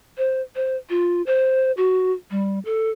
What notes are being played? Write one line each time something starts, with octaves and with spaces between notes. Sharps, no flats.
C5
C5
F4
C5
F#4
G3
A4